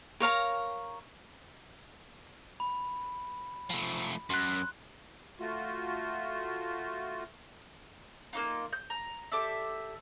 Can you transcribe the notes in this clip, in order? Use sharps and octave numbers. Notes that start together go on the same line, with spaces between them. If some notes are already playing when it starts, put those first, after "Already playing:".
A#4 C#5 F5 A#5
B5
F3 A3
F#2 C6 F#6
A3 F4 F#4
A#3 D4 D#4 F4
G6
A#5
G4 A4 D5 E5